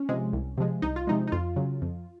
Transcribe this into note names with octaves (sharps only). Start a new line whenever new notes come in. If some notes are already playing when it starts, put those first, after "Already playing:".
Already playing: C#4
C3 F3 G#3
C2
C3 F3 G#3
C2 D#4
F4
C3 F3 G#3 D#4
D#4
F2 F4
C#3 F#3
F2